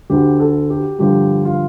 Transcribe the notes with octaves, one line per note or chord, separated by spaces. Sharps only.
D2 D3 A3 G4
A4
G4
G2 D3 F3 G4
F4